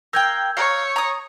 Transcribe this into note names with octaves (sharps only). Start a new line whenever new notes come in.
A#4 F5 G5 E6 G6 G#6
C#5 F5 A#5
A#5 D#6